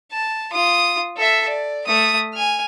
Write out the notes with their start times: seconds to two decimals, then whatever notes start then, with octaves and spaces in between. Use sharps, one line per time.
0.12 A5
0.52 F4 D#6
1.17 A4 E5
1.48 D5
1.87 A3 D#6
2.34 G#5 F6